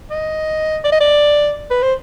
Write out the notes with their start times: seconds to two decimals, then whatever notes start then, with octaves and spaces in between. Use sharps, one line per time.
0.11 D#5
0.84 D5
0.92 D#5
1.01 D5
1.70 B4
1.82 C5